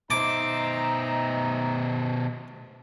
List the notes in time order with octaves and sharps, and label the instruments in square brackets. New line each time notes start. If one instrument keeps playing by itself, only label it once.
[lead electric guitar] B2 C5 [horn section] D#4 E5 A#5 [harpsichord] D6